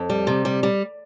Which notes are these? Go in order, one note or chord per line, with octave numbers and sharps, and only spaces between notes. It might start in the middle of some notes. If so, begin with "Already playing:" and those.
Already playing: F2
G3
C3
G3
G3